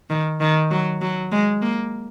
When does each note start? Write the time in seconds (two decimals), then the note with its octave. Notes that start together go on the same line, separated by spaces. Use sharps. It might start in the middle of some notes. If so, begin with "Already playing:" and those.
0.10 D#3
0.41 D#3
0.71 F#3
1.01 F#3
1.32 G#3
1.62 A#3